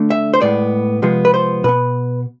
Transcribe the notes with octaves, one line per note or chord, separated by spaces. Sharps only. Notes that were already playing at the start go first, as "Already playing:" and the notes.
Already playing: D3 A3
E5
C5
A2 G#3 B3 D5
C3 F3 G#3 B3
B4
C5
B2 B3 B4